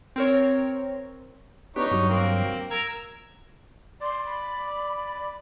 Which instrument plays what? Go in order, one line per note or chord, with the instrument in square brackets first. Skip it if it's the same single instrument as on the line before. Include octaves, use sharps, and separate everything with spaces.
[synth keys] C4 A#4 C#5
[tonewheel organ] B3 D4 G4 [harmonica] D#4 C#5
[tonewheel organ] G2 F#3
[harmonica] A#3 C4
[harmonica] A#4 [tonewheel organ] E6 G#6
[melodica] D5 [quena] C6
[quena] B5